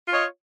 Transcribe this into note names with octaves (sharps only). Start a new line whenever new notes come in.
F4 C#5 D#5